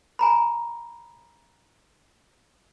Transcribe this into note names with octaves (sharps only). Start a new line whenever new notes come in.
G#5 A#5 B5